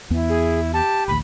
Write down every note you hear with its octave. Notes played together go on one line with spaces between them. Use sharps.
E2 B3 E4
G#4
G4 A5
A1 D2 B5